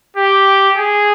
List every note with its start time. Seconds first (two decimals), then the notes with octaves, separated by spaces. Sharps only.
0.16 G4
0.75 G#4